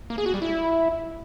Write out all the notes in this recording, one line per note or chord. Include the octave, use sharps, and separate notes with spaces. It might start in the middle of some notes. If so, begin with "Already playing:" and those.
A#3
G#4
F#4
G3
E4